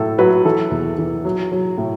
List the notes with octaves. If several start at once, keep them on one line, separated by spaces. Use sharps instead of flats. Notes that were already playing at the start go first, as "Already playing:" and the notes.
Already playing: A2 F#3 A4
F#3 F#4 B4
E3 A4
E2
E3
F#3
F#3
A2